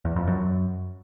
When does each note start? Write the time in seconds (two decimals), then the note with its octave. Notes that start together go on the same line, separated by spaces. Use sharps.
0.05 E2
0.16 F2
0.27 F#2